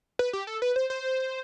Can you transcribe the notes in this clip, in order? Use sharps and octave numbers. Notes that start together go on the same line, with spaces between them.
B4
G4
A4
B4
C5
C5